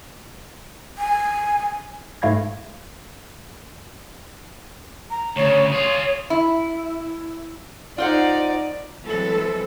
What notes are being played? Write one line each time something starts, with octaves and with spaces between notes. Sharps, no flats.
G#5
G#2 A3 F5 B5 G#6 A#6
A#5
D2 C#3 C#5
F4 G#4 C#5
E4
D#4 F4 C5 D5 F#5
E3 F#3 G#3 C4 A4 B4